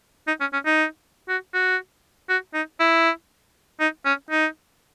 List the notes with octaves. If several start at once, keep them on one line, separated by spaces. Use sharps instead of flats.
D#4
C#4
C#4
D#4
F#4
F#4
F#4
D#4
E4
D#4
C#4
D#4